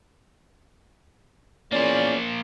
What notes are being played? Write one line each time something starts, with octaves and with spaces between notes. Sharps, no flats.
E2 A#2 A#3 C#4 C5 D5